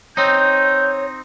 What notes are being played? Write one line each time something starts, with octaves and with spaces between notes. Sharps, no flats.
C4 D#4 C#5 G6